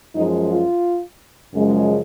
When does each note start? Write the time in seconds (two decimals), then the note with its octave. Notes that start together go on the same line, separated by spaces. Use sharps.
0.15 F#2 F3 G#3 D#4
0.50 F4
1.53 F#2 C#3 F3 G#3